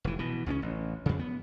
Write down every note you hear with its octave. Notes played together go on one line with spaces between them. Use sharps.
F1 E3
B2 E3
C#2 C#3 C4 C#4
A1
F2 C#3
B3